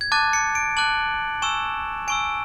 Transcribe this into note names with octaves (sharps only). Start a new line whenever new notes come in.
G#6
A5 D6 F#6 A6
C#7
D7
A5 D6 F#6 F#7
G#5 C#6 E6 E7
G#5 C#6 E6 D7